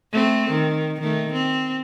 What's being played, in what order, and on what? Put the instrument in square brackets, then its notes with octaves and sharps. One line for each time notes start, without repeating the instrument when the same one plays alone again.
[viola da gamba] A3 C4
D#3
D#3 A3
C4